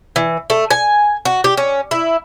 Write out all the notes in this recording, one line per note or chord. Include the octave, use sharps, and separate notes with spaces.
E3
A3
G#5
F#4
G4
C#4
E4